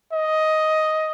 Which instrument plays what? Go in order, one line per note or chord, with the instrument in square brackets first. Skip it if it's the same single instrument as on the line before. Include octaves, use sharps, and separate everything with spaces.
[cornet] D#5